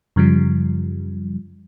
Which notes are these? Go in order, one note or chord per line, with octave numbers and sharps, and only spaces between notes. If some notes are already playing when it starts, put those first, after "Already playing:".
F#2 C#3 F3 G3